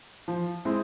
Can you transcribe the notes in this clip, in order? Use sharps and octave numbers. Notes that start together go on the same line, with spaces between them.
F3
G#3 C4 E4